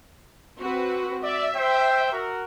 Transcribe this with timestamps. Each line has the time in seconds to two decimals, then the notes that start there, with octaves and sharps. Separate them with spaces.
0.60 C4 F#4 B4
1.24 D5 E5
1.55 C5 G5
2.13 F#4 A#4